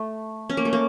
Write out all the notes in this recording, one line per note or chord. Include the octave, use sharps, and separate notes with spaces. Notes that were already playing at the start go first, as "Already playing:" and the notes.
Already playing: A3
C#4
A#3
A3
A#3